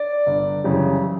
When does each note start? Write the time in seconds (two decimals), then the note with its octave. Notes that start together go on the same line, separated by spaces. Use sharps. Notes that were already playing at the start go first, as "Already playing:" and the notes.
Already playing: D5
0.27 G1
0.64 F#2 C#3 E3 G3